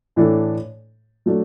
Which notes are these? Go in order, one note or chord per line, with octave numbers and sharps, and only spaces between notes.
A2 E3 D4 A4
F#3 A3 D4